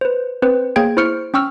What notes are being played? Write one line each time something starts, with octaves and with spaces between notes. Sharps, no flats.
B4 C5
C4 B4 C5
A#3 G#4 C#5 G5 G#6 D7
E4 C5 C#6 F6 C#7 D7
C#4 G5 C#6 E6 F6